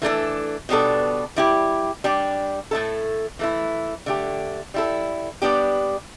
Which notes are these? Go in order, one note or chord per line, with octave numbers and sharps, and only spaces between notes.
E3 A3 D4 A4
B2 G3 B3 D4 A4
G3 E4 G4
G3 D4 G4
A2 A3 E4 A4
E3 A3 E4
D3 A3 G4
G3 E4 A4
G3 B3 D4 G4